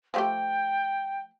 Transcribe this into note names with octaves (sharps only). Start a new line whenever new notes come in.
F3 A3 G4 G5